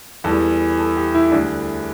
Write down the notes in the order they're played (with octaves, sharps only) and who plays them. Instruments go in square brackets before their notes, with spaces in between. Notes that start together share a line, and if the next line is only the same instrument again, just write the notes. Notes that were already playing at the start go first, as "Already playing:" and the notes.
[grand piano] E2 E3 G3 A4
A4
G4
E4
D2 D3 G3 D4